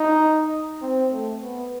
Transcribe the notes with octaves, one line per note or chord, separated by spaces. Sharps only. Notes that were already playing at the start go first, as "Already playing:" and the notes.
Already playing: D#4
C4
A3
B3